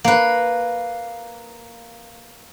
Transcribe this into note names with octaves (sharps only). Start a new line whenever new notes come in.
A#3 B4